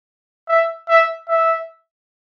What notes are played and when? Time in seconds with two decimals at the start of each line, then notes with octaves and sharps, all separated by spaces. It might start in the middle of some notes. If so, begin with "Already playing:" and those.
0.48 E5
0.89 E5
1.28 E5